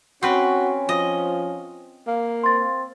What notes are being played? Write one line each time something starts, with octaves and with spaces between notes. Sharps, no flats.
C4 C#4 F#4 B4
F3 D#5
A#3
C4 C6 A6